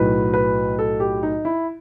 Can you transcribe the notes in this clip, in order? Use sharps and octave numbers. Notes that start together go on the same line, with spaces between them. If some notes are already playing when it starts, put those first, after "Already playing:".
Already playing: B1 A2 F#3 B4
B4
A4
G4
D#4
E4